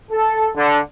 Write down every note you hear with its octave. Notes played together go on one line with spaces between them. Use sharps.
A4
D3